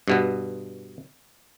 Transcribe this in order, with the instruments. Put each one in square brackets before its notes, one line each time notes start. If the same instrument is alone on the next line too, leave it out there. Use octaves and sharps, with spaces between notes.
[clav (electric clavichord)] G2 B2 B3